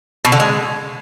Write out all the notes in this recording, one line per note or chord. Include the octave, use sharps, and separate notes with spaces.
B2
D3
G#3